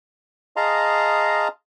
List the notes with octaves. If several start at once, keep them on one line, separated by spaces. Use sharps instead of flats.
G#4 D#5 F5 A5 A#5 C6